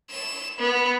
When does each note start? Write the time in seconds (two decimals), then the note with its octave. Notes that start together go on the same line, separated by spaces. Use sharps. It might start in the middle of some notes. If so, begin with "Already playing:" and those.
0.11 E7
0.59 B3